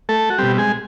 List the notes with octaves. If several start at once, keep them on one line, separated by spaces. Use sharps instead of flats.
A3 A4
F#4
B2 G3 C4 G4
G#3 G#4